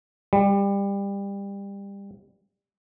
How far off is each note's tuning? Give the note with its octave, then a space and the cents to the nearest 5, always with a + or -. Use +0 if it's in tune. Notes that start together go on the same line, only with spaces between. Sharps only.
G3 +25